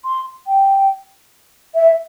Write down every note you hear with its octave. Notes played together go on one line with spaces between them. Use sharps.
C6
G5
E5